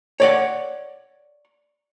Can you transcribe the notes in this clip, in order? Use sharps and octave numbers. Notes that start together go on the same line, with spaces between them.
C#5 D5 F#5